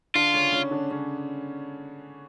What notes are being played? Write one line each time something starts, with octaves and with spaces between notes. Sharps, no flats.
D3 D4 F4
C#3 C#4
C#3 C#4
D3 D4
C#3 C#4